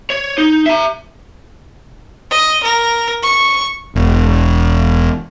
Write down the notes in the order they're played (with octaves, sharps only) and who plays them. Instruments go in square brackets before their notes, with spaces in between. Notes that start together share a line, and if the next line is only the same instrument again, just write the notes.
[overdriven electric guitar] C#5
D#4
E5 A#5
[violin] D#5
A#4
C#6
[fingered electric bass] E1